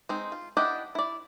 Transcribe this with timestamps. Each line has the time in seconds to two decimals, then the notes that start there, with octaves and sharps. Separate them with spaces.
0.09 G#3 C4 D#4
0.32 F4
0.57 D4 E4 G4 D#5 F#5
0.95 E4 D5